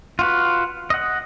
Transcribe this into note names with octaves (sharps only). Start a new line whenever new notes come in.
F4 F#4 B4
D#5 F#5